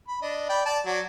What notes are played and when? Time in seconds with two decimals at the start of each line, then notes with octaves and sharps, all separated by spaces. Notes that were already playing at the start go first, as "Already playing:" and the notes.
0.08 B5
0.22 D4 D#5
0.49 D5 G5 B5
0.66 D5 A5
0.86 F#3 D5